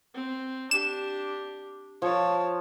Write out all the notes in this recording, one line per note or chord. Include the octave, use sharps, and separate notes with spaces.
C4
D4 G4 E7
F3 C#5 A5